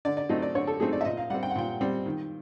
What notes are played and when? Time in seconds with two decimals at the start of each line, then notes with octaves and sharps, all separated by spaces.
0.05 D3 D5
0.17 D5
0.29 F#3 A3 C4 D#4 D#5
0.42 D5
0.55 D3 C#5
0.67 A4
0.80 F#3 A3 C4 D#4 G#4
0.93 D5
1.01 E5
1.05 A#2 D#5
1.17 F5
1.30 G3 C4 F#5
1.43 G5
1.51 F#5
1.55 A#2 G5
1.81 G3 C4
2.06 D#3